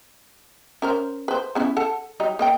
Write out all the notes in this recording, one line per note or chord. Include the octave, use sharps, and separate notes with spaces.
C#4 A#4 C5
B4 C5
B3 C#4 E4
A4 F#5 A5
F#3 G3 D#4
A#3 D#5 G5